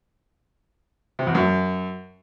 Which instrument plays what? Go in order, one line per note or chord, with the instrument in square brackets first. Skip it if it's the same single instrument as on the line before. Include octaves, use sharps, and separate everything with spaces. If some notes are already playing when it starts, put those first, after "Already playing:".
[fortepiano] C3
E2
F#2